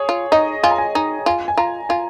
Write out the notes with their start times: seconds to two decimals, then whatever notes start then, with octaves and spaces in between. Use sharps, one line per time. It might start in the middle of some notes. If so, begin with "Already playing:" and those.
Already playing: G#4 C#5
0.09 F4
0.32 D#4 D#5
0.63 F4 G#5
0.71 A#5
0.78 G#5
0.95 D#4 G#5
1.26 F4 G#5
1.48 G#5
1.57 F4 A#5
1.89 F4 G#5